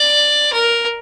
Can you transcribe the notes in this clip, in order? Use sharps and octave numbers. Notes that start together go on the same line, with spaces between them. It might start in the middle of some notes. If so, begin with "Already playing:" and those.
Already playing: D5
A#4